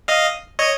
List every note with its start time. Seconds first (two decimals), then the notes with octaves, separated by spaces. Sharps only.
0.08 D#5 F5
0.59 C#5 D#5